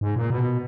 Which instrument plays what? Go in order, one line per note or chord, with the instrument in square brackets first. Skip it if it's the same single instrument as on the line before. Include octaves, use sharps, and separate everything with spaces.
[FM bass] G#2
A#2
B2